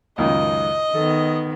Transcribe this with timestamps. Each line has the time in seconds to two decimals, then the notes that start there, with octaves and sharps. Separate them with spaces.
0.18 C#2 F#2 D#3 D#5
0.95 D#3 B3 A4